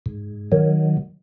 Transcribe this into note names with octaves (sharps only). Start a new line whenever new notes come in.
G#2
D#3 F#3